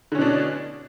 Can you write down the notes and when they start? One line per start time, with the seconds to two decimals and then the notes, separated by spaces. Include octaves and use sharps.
0.12 D3
0.15 C#4
0.18 B2
0.21 D4